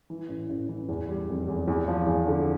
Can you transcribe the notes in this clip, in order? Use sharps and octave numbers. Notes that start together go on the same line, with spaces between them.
E3
A1
A1
E3
E2
G3
F1
E2
E2
F3
E2
D3